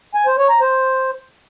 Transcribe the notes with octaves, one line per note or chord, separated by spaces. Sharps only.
G#5
C5
C#5
A#5
C5